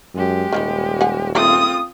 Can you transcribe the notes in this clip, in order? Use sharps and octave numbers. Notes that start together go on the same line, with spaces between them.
F#2 G#3 G4
D#1 D#3 F3 G3
F#5 G#5
C#3 A3 C4 F4 A4 D#6